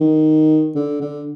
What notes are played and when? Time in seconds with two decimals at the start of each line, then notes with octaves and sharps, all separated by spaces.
0.01 D#3
0.76 D3
1.01 D3